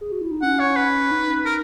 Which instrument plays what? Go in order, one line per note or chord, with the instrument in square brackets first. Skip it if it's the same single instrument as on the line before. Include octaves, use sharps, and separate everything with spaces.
[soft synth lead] G#4
F#4
E4
D#4
[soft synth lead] C#4 [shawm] F#5
[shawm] C#5
B4
[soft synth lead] D#4
[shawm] A#4